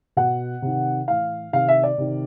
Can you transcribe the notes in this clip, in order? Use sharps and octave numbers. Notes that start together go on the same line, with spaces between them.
B2 F#5
C3 D#3
A2 E3 F5
C3 D#3 F5
E5
D5
C3 D#3